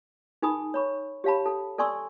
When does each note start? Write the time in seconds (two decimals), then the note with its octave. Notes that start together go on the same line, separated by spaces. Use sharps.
0.42 D#4 G#4 A#4 G#5 B5 D#6
0.74 C#5 B5 C#6
1.24 G4 C#5 F5 A5 B5
1.45 A4 A5
1.78 A4 D5 G#5 C6 C#6 E6